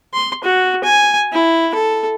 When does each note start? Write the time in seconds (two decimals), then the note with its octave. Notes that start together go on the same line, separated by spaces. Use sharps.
0.14 C6
0.44 F#4
0.84 G#5
1.33 E4
1.75 A4